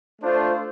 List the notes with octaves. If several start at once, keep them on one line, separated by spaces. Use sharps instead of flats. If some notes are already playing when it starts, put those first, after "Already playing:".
A3 D4 F4 C5